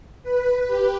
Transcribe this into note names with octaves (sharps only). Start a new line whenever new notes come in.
B4
G4